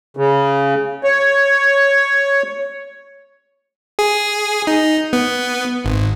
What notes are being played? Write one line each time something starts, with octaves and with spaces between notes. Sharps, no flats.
C#3
C#5
G#4
D#4
B3
G#1